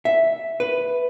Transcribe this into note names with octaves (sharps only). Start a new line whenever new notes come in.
E5
B4